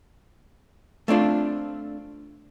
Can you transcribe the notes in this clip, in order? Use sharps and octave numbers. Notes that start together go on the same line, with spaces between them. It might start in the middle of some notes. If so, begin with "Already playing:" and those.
A3 C4 D4 F4